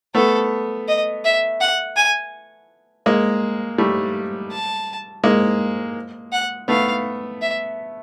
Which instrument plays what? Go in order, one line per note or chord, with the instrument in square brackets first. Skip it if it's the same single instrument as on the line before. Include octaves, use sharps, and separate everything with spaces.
[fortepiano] A3 B3 [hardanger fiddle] A4
[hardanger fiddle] D#5
E5
F#5
G#5
[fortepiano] G#3 A#3
G3 A3
[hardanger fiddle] A5
[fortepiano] G#3 A#3
[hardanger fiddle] F#5
[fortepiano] A3 B3 [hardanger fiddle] F5
[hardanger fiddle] E5